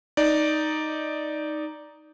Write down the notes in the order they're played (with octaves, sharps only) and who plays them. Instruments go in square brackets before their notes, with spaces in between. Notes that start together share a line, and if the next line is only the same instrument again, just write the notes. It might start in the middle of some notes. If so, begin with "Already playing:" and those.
[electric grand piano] D#4 D5